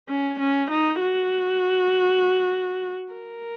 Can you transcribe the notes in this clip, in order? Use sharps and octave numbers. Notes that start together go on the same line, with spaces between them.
C#4
C#4
D#4
F#4
A#4